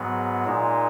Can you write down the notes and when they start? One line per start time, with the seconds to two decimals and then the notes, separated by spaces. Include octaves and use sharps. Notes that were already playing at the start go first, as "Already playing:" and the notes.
Already playing: G#2 F#3 B3
0.45 A#2 G#3 D#4